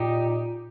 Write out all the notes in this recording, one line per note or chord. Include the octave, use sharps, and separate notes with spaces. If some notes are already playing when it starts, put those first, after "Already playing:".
Already playing: A#2 D#4 G4